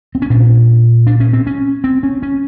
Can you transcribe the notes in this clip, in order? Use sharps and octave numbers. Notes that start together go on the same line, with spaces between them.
C4
C#4
A#2 D4
D4
C#4
C4
C#4
C4
C#4
C#4